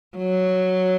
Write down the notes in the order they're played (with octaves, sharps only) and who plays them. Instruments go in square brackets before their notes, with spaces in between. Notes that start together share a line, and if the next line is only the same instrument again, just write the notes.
[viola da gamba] F#3